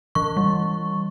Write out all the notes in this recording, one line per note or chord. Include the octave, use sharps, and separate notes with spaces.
E3 C#6
G3